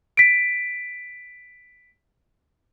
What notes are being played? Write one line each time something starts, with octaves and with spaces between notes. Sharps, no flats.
B6 D7